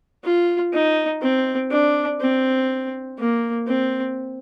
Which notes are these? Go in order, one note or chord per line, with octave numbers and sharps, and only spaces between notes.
F4
D#4
C4
D4
C4
A#3
C4